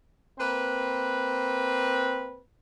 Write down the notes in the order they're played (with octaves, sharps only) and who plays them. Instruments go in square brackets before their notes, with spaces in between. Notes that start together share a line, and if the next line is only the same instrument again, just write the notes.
[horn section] A#3 C4 B4